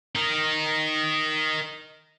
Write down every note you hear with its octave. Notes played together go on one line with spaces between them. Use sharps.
D#4 A#4